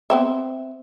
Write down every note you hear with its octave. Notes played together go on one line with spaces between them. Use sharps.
B3 C4 E5